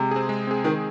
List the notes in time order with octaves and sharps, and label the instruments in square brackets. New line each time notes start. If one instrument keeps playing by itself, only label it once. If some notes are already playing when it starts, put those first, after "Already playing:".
Already playing: [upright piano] C3 [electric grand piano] G#3
[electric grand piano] C4 G#4
G#3
C4 G#4
[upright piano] D#3 [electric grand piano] G#3